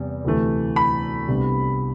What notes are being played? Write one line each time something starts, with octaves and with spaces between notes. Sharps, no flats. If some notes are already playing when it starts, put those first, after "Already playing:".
Already playing: E2 C3 G3
D2 C3 E3 A3
B5
C2 C3 G3 B3 D4